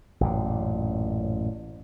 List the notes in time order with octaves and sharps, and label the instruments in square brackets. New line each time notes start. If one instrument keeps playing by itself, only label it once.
[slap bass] A1 F#2 A#2